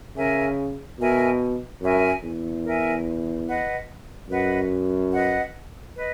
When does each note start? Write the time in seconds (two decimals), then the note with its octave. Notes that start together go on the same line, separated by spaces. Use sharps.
0.17 C#3 A#4 E5 G#5
0.99 B2 A#4 E5 G#5
1.82 F#2 A#4 E5 G#5
2.23 E2
2.64 A#4 E5 G#5
3.47 B4 D#5 F#5
4.30 F#2 B4 D#5 F#5
5.13 B4 D#5 F#5
5.96 B4 D#5